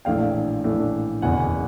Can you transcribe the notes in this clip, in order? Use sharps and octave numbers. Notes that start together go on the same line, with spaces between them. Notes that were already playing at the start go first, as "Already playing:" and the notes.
A#1 A2 E3 A3 D4 F5 G5
A#1 A2 E3 A3 D4
F#1 E2 B2 F#5 G#5